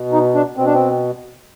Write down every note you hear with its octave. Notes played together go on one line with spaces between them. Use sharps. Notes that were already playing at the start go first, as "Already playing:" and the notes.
Already playing: B2
D#4
D4
B2 C4
D4
C4